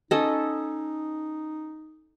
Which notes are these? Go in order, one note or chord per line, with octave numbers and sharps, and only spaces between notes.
C#4 D#4 A4 D#5